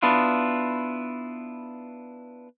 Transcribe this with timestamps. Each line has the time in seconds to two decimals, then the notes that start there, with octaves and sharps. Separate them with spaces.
0.03 B3 D4 E4 F4